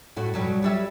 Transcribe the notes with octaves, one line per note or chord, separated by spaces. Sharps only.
A2 F#4
B2 F#3 G3
F#3 G3 E5